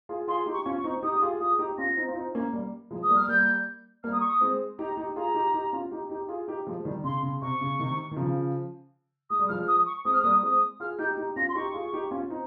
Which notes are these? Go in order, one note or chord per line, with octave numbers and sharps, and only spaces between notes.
F4 G#4
F4 G#4 C6
D#4 G4
C#6
C#4 F4
C#6
C4 D#4
D#4 G4 D#6
G4
F4 G#4
F4 G#4 D#6
D#4 G4
C#4 F4 A#6
C4 D#4
F4
C4 D#4
A#3 C#4
G3 A#3
F3 G#3
D#6
G3 A#3
F6
G3 A#3 G6
G3 A#3 F6
D#6
C#6
D#6
G#3 C4
D#4 G4 A#5
D#4 G4
F4 G#4 A#5
D#4 G4
D#4 G4
C#4 F4
D#4 G4
D#4 G4
F4 G#4
D#4 G4
F3 G#3
D#3 G3
C#3 C6
C#3
C3 C#6
C#3
C3 D#3
D#3
C#3 F3
G#3 D#6
G3
F3 G#3 F6
D#6
C#6
G#3 C4 D#6
F6
G3 A#3 D#6
G#3 C4 D#6
F4 G#4 F6
D#4 G4 G6
D#4 G4
C#4 F4 A#6
C6
D#4 G4 C#6
F4 G#4
D#4 G4
C#4 F4
C4 D#4